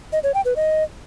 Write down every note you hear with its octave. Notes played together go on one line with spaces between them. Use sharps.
D#5
C#5
G5
B4
D#5